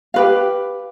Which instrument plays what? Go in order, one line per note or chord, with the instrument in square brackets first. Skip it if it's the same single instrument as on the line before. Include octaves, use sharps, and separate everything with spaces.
[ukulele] G4 B4 F5